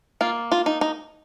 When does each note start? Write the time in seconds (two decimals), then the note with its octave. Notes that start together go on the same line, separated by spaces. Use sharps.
0.21 A#3 F4
0.52 F4
0.66 D#4
0.81 D#4